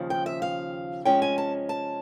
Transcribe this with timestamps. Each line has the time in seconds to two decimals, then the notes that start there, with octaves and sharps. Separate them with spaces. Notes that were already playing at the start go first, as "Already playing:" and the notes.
Already playing: D#2 C#3 F3
0.10 G5
0.26 E5
0.42 F5
1.05 C3 F3 G#3 C#4 G5
1.22 G#5
1.38 A5
1.69 A5